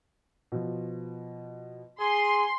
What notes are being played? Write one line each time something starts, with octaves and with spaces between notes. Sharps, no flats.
B2 F3
G#4 C6